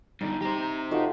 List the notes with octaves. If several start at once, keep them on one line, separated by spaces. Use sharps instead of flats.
G2 D3 D#4
G4 C5 A#5
A3 D#4 F4 F#4